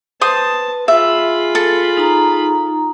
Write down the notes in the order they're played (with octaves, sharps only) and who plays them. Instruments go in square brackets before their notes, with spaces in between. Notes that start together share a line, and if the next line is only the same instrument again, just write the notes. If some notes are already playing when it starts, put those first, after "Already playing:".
[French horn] B4 [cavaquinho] C5 D#6 [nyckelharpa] A5
[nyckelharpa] F4 B5 [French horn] G#4 [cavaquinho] E5
[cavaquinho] A4
[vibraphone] D#4 A#5